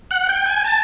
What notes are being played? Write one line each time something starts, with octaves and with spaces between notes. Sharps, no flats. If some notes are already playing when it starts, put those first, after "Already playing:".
F#5
G5
G#5
A5